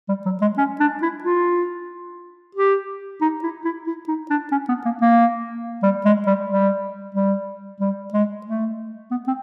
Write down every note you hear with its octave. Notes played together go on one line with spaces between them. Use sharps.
G3
F#3
G#3
C#4
D4
E4
F4
G4
D#4
E4
E4
E4
D#4
D4
C#4
B3
A#3
A#3
G3
G#3
G3
G3
G3
G3
G#3
A3
B3
C4